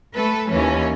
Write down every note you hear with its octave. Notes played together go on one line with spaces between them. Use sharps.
A3 A4 B4
D#2 E3 C#4